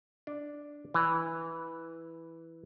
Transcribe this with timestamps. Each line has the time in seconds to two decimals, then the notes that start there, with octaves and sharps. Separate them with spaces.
0.27 D4
0.94 E3